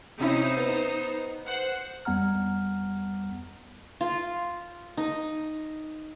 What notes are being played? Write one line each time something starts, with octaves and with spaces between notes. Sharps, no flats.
C3 C#4 D#4 E4 C5
B3
C5 F#5
F2 G3 B3 F#5 A#5 F6
F4
D#4